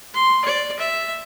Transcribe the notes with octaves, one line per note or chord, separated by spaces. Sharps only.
C6
D5
E5